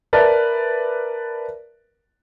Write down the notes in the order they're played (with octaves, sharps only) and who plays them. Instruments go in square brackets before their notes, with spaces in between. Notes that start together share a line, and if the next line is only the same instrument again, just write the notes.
[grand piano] A#4 B4 D5 E5 A5